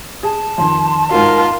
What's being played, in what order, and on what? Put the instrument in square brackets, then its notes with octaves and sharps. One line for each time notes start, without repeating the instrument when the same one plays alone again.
[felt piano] G#4 [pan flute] A5
[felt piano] F2 D#3 [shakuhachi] C6
[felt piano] G#2 D#4 F#4 [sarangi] F4 [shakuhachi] A#4